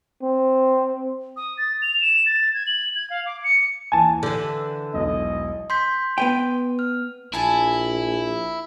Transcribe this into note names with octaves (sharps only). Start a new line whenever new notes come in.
C4
D#6
A6
F7
E7
A6
G#6
F#7
G#6
F5
D6
C#7
D#2 E3 G#5 A5
D3 E3 G6
E1 B1 E4 D#5
C6 G6 B6
B3 B4 G5
F6
A#1 E4 G#5 A5